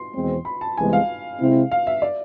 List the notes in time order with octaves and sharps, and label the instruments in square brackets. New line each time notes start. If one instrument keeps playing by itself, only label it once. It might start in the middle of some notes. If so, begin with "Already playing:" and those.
Already playing: [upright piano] C6
[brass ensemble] E2 B2 G#3 C4
[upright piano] B5
A5
[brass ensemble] C2 C3 E3 G#3 B3 [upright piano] G#5
[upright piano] F5
[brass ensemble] C3 G#3 C4 E4
[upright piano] F5
E5
D5